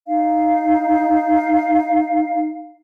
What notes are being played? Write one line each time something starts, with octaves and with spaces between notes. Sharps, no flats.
D#4 F5